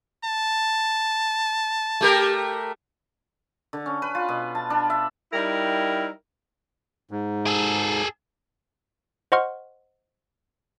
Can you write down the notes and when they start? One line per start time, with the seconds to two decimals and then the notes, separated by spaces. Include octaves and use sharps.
0.25 A5
2.01 A3 G4 A#4
3.73 D3
3.86 C#4
4.02 B4
4.15 F4
4.29 B2
4.55 A5
4.70 D4
4.90 E5
5.33 G3 D#4 E4 A#4 G5
7.11 G#2
7.46 G#4 A4
9.32 C5 D#5 F#5 C6 C#6 F6